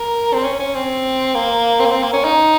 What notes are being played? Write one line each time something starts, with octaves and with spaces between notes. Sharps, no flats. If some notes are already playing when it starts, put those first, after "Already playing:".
Already playing: A#4
C4
C#4
C#4
C4
A#3
C4
A#3
C4
A#3
C#4
D#4